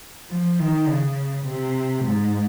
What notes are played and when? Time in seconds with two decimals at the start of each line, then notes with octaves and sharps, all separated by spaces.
0.31 F3
0.59 D#3
0.88 C#3
1.46 C3
2.04 G#2